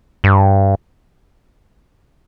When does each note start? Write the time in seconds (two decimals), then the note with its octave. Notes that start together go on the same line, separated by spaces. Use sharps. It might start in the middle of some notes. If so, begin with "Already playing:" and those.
0.24 G2